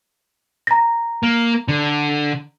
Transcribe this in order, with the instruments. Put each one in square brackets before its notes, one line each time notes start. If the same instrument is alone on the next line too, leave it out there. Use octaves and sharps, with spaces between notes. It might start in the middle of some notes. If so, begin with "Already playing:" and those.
[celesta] A#5 A#6
[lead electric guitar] A#3
D3